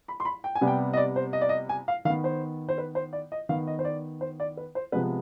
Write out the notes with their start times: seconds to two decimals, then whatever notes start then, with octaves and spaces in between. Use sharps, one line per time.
0.08 B5
0.20 C6
0.25 B5
0.44 G5
0.55 G#5
0.61 C3 G3 B3
0.67 G5
0.93 D#5
0.97 D5
1.16 C5
1.33 D#5
1.41 D5
1.49 D#5
1.69 G#5
1.88 F5
2.05 D#3 F5
2.10 B3
2.24 C5
2.69 C5
2.78 B4
2.95 C5
3.13 D5
3.32 D#5
3.49 D#3 B3 F5
3.67 D#5
3.79 C5
3.85 D5
4.21 C5
4.40 D5
4.57 B4
4.75 C5
4.92 C3 F3 G#3 B3 B4